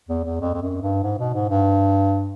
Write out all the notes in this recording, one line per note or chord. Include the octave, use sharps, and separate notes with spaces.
E2
E2
F2
F2
F#2
G2
G#2
B2
G#2
G2